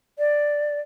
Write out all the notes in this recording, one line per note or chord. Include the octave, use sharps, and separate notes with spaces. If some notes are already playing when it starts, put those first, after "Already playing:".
D5